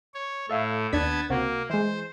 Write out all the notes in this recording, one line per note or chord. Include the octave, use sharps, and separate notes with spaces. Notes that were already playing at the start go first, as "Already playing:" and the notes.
C#5
A2 A4 E5 F5
D#2 B3 D4 A5 G#6 B6
C#2 C3 A#3 F#4
E3 G#3 C5